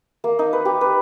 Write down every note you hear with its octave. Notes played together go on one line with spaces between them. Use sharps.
A#3
D#4
B4
G4
B4